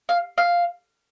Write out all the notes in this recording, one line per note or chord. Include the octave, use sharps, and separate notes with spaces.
F5
F5